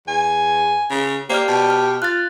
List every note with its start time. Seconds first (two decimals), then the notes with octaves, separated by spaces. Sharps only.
0.07 E2 G#5
0.90 C#3
1.30 A#3 G4 C5 D5 F6
1.48 B2 A5
1.70 F6
2.02 F4 F#6 A6